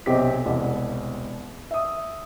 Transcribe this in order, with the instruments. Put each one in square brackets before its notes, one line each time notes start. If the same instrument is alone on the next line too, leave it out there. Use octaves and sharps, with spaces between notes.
[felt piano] B1 C3 C4 G4 D#5 B6
E1 C2 D#5 F#5
E5 D#6